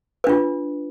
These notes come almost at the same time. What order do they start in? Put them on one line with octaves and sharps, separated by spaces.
B4 D4 F4